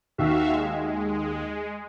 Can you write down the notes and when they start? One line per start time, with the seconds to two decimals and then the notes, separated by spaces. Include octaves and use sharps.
0.18 D#2 D#3 F#4 E5 F5
0.51 G#3